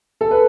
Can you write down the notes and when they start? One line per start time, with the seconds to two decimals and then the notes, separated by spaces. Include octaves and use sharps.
0.21 A4
0.31 B4